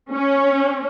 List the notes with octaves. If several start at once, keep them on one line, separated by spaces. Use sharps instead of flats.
C#4